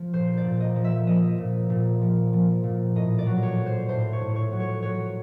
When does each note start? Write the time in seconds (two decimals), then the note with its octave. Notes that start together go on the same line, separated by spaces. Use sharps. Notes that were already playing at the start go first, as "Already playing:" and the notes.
Already playing: F3
0.13 A#2 C5
0.37 D5
0.45 A#2
0.60 D#5
0.76 F3
0.84 E5
1.07 F3 D#5
1.38 A#2
1.70 A#2
2.01 F3
2.33 F3
2.64 A#2
2.95 A2 D#5
3.18 D5
3.26 F#3
3.43 C#5
3.57 F#3
3.66 C5
3.89 A2 C5
4.13 C#5
4.21 A2
4.36 C#5
4.52 F#3
4.60 C#5
4.83 F#3 C#5